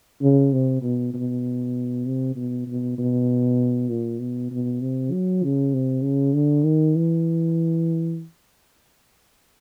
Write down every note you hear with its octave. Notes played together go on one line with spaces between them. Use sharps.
C#3
C3
B2
B2
C3
B2
B2
B2
A#2
B2
B2
C3
F#3
C#3
C3
C#3
D3
D#3
E3